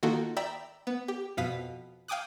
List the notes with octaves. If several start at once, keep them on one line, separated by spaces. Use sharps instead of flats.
D#3 A#3 F4 F#4 A4
D5 E5 G5 A#5 B5 E6
B3
G4
F2 B2 F5 D#6 B6
F5 G5 G#5 D6 D#6 F#6